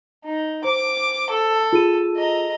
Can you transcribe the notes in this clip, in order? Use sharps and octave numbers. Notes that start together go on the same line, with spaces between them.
D#4
C5 D6
A4
F4 G#4 D#7
D#5 A#5